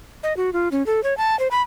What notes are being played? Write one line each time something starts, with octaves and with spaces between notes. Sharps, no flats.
D#5
F#4
F4
C#4
A4
C#5
A5
C5
B5